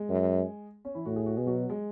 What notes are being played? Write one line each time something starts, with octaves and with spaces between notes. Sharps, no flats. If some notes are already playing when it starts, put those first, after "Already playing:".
Already playing: G#3 G#4
F#2
C#4
E3 E4
A2 F#4
G#4
F#4
B2 G#4
F#3 F#4
G#3 G#4